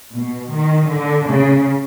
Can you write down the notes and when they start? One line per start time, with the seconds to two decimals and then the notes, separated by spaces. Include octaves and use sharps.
0.12 B2
0.50 D#3
0.87 D3
1.25 C#3